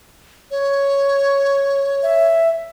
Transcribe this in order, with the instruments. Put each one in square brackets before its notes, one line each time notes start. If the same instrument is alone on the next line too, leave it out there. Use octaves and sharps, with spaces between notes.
[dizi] C#5
[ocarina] E5